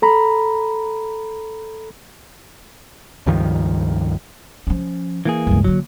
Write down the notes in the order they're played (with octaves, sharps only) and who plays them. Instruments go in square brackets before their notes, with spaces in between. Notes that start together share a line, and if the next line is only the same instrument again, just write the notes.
[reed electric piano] A4 A#5 B5
[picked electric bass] C#2 G2 D#3 F3
[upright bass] F3 C#4
[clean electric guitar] E3 A#3 G#4
[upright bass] C#2 G2
[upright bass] D3 A#3 [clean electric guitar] F#3